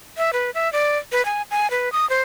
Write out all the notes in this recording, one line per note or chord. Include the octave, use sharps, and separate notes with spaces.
E5
B4
E5
D5
B4
G#5
G#5
B4
D#6
C5